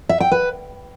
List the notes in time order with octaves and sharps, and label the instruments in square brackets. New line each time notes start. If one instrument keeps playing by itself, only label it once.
[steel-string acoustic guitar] E5
G5
B4